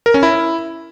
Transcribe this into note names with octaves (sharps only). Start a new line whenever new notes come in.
A#4
C#4
E4